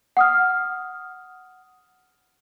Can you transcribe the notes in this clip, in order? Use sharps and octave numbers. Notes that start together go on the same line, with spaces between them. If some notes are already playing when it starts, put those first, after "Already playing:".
F#5 D#6 F6